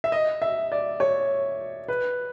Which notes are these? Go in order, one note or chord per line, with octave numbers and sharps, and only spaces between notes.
E5
D#5
E5
D5
C#5
B4